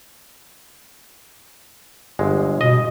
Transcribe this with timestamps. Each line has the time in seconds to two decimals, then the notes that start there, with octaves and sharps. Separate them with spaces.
2.19 G1 G#3
2.61 B2 D#5